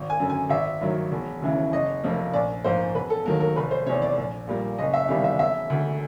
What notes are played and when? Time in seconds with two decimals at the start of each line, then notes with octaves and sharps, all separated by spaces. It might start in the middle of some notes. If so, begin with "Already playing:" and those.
Already playing: G#1
0.10 G#5
0.20 F#2 D3
0.30 G#5
0.50 G#1 E5
0.81 G2 D#3 F#3
1.12 E1
1.42 D#2 C#3 E3
1.72 F#1 D#5
2.04 F2 C3 F3 A#3
2.33 A#1 D5
2.64 G#2 F3 A#3 C5
2.95 E1 B4
3.10 A4
3.26 D#2 D#3 F#3 A#3 A#4
3.41 A#4
3.56 F1 B4
3.71 C5
3.86 C3 C#5
3.89 E2
4.02 D5
4.17 A#1
4.48 A#2 G3 A#3
4.78 F#1 D#5
4.94 E5
5.08 E2 C3 D#3 G3 F5
5.24 E5
5.39 E1 E5
5.70 D2 D3